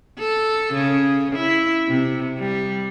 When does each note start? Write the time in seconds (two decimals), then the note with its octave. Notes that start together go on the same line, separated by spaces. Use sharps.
0.19 A4
0.73 C#3
1.35 E4
1.87 C3
2.38 G3